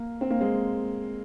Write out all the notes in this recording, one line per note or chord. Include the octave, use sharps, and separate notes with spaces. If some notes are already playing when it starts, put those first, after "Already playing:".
Already playing: A#3
C4
A#3
G#3 C4